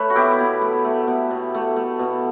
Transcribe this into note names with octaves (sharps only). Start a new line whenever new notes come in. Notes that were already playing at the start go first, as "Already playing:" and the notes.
Already playing: A3 B4 C#5
F#4
B2 E4 G4
B2
A3
A3
B2
B2
A3
A3
B2